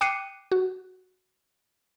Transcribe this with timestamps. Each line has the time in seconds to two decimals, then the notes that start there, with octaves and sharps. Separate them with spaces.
0.01 G5 D6 F#6 C7 C#7 D#7
0.52 F#4